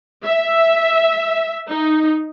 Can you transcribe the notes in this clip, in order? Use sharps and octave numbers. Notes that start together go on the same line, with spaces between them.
E5
D#4